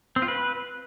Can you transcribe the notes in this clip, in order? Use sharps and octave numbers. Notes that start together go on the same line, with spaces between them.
C4
F4
B4